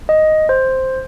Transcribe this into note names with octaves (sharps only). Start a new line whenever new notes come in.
D#5
C5